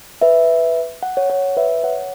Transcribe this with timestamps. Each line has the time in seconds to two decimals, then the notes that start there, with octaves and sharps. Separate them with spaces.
0.22 B4 E5
1.03 F#5
1.17 C#5 F#5
1.30 C#5 F#5
1.57 B4 E5
1.83 C#5 F#5